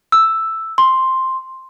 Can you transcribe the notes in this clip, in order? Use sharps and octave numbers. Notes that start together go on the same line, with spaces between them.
E6
C6